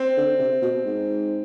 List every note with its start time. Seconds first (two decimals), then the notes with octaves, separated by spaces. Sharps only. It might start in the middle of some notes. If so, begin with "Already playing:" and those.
Already playing: C4
0.17 D3
0.39 C3
0.62 B2
0.85 G#2